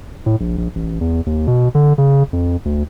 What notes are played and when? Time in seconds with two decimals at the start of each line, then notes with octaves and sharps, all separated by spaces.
0.26 A2
0.40 A#1
0.58 A#1
0.75 A1
1.01 E2
1.26 D#2
1.47 B2
1.75 D3
1.98 C#3
2.33 F2
2.65 D2